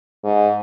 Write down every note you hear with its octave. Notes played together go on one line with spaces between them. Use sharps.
G#2